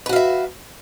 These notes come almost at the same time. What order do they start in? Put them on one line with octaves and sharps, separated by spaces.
B4 F#4 F5 E5